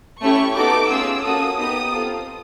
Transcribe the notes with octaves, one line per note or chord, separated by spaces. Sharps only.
A3 C#4 E4 G4 C#6
B3 D#4 F#4 A4 D6
A3 C#4 F4 G#4 E6
A#3 C#4 F#4 A4 D#6
B3 D#4 G4 D#6
C4 F4 A4